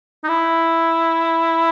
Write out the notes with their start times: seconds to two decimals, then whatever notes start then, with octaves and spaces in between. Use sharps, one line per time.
0.24 D#4
0.29 E4